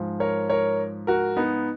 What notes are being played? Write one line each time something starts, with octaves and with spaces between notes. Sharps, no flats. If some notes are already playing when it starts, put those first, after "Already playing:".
Already playing: G#2 F3
A#4 C#5
A#4 C#5
F#4 A#4
B3 D#4